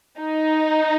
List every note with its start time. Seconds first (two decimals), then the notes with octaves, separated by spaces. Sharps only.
0.19 D#4